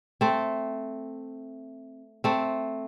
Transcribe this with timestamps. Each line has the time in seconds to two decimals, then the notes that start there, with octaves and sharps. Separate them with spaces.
0.21 A3 C4
2.24 A3 C4